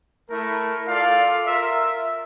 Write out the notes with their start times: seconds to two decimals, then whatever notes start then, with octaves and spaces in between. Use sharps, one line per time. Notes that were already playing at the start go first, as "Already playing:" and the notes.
0.30 A3 E4 A#4
0.88 F4 A4 D5 F5
1.46 F4 A#4 E5